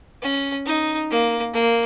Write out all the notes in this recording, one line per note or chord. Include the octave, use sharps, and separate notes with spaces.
C#4
D#4
A#3
A#3